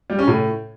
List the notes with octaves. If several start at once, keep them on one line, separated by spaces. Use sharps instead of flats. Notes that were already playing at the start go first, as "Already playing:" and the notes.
G3
C#4
A2